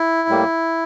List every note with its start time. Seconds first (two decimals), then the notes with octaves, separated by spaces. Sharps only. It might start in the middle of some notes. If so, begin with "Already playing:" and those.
Already playing: E4
0.28 A2 G3 A#3